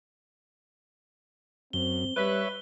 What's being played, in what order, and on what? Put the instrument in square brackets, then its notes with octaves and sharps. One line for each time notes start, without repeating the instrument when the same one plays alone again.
[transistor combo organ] F#2 [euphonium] C4 [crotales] G7
[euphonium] G3 [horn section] B4 [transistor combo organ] C#5 E5